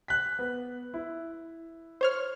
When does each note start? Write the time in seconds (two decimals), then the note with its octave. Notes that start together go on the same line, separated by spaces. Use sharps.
0.08 F#6 B6
0.39 B3
0.94 E4
2.01 C5 C#5 F6